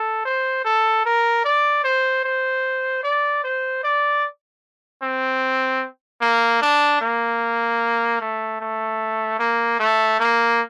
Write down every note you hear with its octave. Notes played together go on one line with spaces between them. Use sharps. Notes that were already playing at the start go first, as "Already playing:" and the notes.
Already playing: A4
C5
A4
A#4
D5
C5
C5
D5
C5
D5
C4
A#3
D4
A#3
A3
A3
A#3
A3
A#3